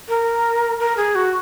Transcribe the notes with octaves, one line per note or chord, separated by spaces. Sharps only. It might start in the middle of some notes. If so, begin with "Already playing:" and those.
A#4
A#4
G#4
F#4